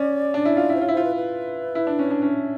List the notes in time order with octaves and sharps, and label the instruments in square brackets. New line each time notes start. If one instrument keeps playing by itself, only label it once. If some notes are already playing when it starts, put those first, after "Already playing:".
Already playing: [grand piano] C#4 [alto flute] D5
[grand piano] D4
E4
F4
E4
[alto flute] C5
[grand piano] F4 [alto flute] C#5
[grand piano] E4
[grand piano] F4 [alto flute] C5
[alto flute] B4
B4
[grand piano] E4
D4
C#4
D4
C#4